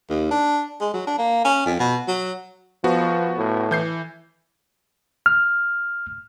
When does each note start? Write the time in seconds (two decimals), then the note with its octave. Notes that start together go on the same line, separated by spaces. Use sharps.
0.10 D#2
0.31 D4
0.81 G#3
0.93 F#3
1.07 D4
1.18 A#3
1.44 C#4
1.65 F2
1.79 B2
2.08 F#3
2.84 F3 B3 F#4
3.37 A2
3.71 E3 G6 C7
5.26 F6